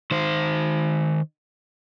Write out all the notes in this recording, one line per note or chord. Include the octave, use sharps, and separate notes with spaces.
D#3 C5